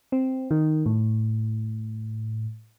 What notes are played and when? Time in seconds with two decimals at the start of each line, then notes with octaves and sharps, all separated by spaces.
0.12 C4
0.51 D#3
0.86 A2